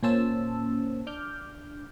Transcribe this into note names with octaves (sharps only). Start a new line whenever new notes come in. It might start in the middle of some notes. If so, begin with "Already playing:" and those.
A#2 A#3 C#4 C5 A5 E6
D4 D6 F6 G6